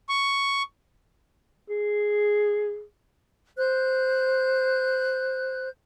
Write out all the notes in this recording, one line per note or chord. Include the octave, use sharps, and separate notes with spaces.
C#6
G#4
C5 F#6 G6